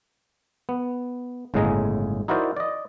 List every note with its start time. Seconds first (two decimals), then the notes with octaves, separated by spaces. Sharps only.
0.69 B3
1.54 G1 A2 C#3 G#3 G#4 A#5
2.28 D#4 E4 F#4 A#4 C5 D5
2.57 D5 D#5